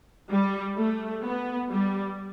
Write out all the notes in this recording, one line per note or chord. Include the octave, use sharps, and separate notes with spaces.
G3
A3
B3
G3